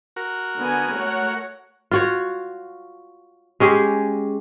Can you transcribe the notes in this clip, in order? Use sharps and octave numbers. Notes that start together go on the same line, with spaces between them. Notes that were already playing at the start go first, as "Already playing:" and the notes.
F#4 A#4
D3 B3 G#5
A3 C#5 F#5
F4 F#4 C#5
G#3 C#4 G4 G#4